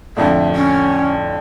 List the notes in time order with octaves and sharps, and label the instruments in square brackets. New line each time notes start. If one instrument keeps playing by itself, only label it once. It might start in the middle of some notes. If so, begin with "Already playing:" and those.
[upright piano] F2 A2 D3 [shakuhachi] E5
[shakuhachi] C#4